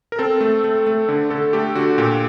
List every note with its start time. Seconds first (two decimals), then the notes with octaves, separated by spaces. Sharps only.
0.12 A#4
0.19 C4 A4
0.41 A3
0.64 A3
0.87 A3
1.09 D3
1.30 D3 A4
1.53 A3 G4
1.75 D3 F#4
1.98 A#2 G4